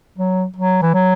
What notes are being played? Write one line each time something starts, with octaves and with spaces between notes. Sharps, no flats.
F#3
F#3
E3
F#3